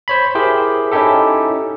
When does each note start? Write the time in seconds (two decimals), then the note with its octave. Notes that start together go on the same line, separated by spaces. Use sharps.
0.08 C5 C#5 B5
0.35 E4 G4 G#4 A#4 C5
0.92 C#4 D#4 E4 G4 A4